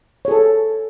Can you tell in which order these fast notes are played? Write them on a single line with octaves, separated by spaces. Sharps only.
C#5 G#4 A4